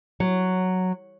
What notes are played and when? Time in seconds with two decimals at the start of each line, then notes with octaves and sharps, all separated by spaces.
0.20 F#3